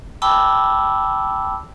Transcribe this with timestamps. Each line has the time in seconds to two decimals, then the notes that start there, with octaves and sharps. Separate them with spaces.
0.22 G5 A5 B5 D6 E6